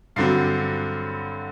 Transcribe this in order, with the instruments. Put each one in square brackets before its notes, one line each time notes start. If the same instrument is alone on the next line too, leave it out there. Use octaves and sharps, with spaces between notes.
[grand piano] G2 D3 F#3 C4 C7